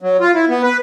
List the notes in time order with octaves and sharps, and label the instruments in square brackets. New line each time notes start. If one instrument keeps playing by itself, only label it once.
[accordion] F#3
F4
E4
B3
B4